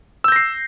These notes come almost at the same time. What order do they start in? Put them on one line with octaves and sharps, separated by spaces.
E6 G6 A#6 C7